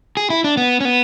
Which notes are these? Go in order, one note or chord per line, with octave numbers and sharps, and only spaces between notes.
G#4
E4
D4
B3
C#4
B3